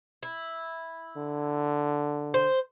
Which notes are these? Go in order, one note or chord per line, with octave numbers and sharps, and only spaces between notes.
E4
D3
C5